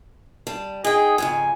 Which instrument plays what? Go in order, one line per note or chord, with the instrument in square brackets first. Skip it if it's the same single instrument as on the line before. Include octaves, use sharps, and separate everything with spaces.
[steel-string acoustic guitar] G3 A5
[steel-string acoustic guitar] D#4 G5 [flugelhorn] G#4
[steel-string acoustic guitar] F2 G#2 C#3 [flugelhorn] G#5